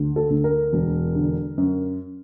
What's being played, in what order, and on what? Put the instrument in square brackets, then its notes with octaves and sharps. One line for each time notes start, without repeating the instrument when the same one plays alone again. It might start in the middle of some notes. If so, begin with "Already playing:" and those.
Already playing: [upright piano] D2
A4
D2
A#4
E1
D3
F#2